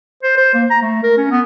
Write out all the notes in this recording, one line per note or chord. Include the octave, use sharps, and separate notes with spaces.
C5
C5
A#3
A#5
A3
A#4
C#4
B3